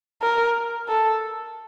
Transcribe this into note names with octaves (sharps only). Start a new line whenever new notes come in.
A#4
A4